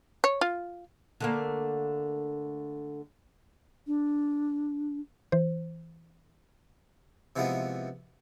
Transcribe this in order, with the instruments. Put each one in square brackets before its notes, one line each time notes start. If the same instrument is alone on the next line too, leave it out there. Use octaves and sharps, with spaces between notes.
[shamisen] C#5
F4
[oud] D3 A3 A#3
[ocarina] D4
[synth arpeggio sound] E3 C5
[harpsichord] C3 E3 F3 G#3 B3